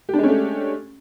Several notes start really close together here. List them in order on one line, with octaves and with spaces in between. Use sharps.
G4 D4 G#3 C#4 A3